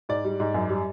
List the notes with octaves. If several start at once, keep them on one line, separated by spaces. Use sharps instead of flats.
G#2 D5
G3
G#2
F#2
G3